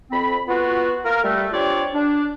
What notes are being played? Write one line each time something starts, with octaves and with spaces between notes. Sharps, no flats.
F2 C4 B5
B3 F4 F#4
F4 A#4
G3 A3
C4 D4 F4 G4 C#5 D5
D4